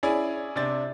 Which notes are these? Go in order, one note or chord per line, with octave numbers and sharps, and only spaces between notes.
C#4 E4 G#4 D5
C3 C4 D4 A6